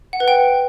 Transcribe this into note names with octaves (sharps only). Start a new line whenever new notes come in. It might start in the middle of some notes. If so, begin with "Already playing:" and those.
F#5
B4
G5